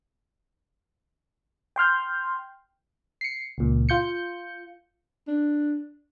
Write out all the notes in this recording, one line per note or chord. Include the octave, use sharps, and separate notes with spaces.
G5 C6 F6 G6
C7 C#7
C#2 A#2
F4 G6 C#7
D4